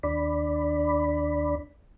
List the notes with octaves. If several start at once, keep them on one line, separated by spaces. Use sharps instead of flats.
D#2 D4 D5 B5